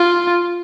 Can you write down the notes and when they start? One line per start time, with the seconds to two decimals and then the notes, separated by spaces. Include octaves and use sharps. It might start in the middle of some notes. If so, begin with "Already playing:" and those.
Already playing: F4